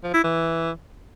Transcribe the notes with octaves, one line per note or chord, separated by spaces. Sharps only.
F3
E4
E3